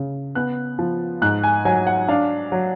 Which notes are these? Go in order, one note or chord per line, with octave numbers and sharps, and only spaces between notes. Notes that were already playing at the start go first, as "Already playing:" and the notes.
Already playing: C#3
B3 F#6
F3
G#2 F#6
G#5
F#3 G#5
F#5
D4 F5
F#3